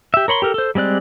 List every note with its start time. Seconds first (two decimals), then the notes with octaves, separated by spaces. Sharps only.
0.14 G4 E5
0.28 A#4 C#5 B5 C6
0.42 G4 A4 A#4
0.54 A4 C5
0.75 G3 G#3 C4 D5 F#6